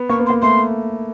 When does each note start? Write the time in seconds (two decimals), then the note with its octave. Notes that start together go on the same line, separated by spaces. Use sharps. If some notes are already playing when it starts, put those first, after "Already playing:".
Already playing: B3
0.10 A#3 C#6
0.20 B3
0.26 C6
0.30 A#3
0.42 A3 C6